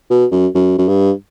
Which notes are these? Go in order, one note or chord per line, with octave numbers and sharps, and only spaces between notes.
B2
F#2
F#2
F#2
G2